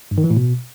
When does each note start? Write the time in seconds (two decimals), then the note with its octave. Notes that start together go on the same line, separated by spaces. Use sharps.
0.11 G2
0.18 D#3
0.24 E3
0.30 A2
0.37 B2